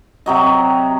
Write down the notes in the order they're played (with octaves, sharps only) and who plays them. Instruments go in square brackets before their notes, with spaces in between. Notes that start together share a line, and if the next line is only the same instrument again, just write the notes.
[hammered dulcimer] C3 F#3 D#5